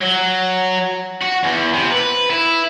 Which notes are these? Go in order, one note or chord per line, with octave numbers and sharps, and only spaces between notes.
F#3
F#4
E2
C3
B4
E4